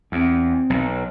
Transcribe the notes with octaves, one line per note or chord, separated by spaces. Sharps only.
E2 C4
B1